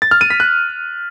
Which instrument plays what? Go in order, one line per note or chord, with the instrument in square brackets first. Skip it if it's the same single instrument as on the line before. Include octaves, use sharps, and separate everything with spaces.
[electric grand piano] A6
F6
D#7
B6
F#6